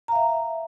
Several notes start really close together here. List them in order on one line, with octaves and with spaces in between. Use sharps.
A#5 F5 E5